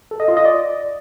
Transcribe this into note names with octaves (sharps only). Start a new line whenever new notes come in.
A4
D#5
F4
D#5
D5